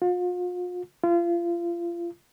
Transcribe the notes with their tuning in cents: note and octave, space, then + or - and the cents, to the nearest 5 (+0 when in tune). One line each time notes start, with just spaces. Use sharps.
F4 +40
F4 -30